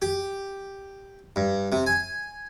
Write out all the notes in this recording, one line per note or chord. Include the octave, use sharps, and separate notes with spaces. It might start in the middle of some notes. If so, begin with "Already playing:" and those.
G4
G2
C3
G#5